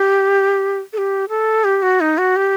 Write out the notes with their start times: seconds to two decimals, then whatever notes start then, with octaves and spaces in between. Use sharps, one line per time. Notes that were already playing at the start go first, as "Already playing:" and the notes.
Already playing: G4
0.93 A4
0.98 G4
1.29 A4
1.64 G4
1.82 F#4
2.01 D#4
2.18 F#4
2.36 G4